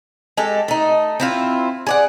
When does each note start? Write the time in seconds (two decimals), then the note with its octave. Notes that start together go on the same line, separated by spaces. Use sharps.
0.37 G#3 G4 A4
0.68 A3 D#4
1.20 C4 E4 F4
1.87 G#4 D5 F#5